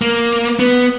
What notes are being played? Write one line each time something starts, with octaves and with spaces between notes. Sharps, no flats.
A#3
B3